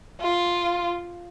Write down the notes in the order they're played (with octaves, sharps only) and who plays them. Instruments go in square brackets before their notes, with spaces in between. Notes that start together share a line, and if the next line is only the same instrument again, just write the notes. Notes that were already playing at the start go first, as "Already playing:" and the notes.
[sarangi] F4